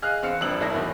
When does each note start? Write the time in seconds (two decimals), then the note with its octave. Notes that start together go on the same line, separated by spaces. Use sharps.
0.02 G#4 D#5 F5 F6 F#6
0.22 E2 C4 F5 F6 C#7
0.41 F1 A#1 G2 C4 E6 F#7
0.60 E1 C2 E4 A#6
0.74 B1 E2 A2